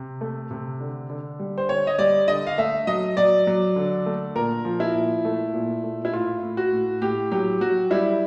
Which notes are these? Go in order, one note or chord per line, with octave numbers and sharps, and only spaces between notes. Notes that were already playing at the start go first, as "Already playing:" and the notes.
Already playing: C3
A3
C3
D3
D3
G3
C5
D3 C#5
D#5
G3 D5
D3 D#5
F5
A3 E5
F#3 D#5
F#3 D5
F#3
D3
A3
A#2 A#4
F3
E4
A#2
A3
A#2
A3
E4
A2 F4
A2
F#4
A2
A2 G4
F#3 G4
F#3 F#4
G3 E4